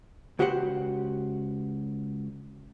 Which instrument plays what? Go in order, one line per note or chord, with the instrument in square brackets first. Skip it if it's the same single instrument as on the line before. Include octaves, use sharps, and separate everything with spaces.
[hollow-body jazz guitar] C#2 F#4 G4 C5 F#5